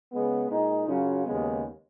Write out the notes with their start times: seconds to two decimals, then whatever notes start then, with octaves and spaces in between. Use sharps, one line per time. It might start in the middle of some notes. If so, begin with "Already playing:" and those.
0.11 C#3 G#3 B3
0.48 A#2 G#3 D#4
0.87 F#2 C#3 F#3 C#4 F4
1.25 D#2 C#3 G#3 B3